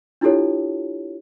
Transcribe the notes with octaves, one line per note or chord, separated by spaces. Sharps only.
D4 E4 F4 G4 A4 C#5